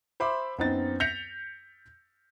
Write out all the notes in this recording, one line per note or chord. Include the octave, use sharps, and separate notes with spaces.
C5 E5 B5 C6 D6
F#2 B3 C4 D#4 A6
G6 A#6 B6 C#7 F7